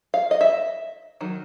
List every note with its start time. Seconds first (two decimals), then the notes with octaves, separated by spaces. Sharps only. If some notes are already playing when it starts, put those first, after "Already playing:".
0.14 F5
0.31 D#5
0.41 E5
1.21 D#3 F#3